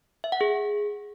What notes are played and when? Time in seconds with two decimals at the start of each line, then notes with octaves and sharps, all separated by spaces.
0.24 E5
0.32 F#5
0.41 G#4